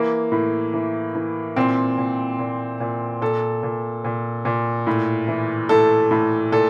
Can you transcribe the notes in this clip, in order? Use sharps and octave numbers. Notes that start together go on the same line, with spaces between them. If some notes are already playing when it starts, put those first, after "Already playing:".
Already playing: E3 A#3
A2
E3
E3
A#2 C4
A#2
A#2
A#2
A#2 A4
A#2
A#2
A#2
A2
E3
A2 A4
A2
A#2 A4